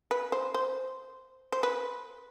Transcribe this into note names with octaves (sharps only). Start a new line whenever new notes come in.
B4
C5
C5
C5
B4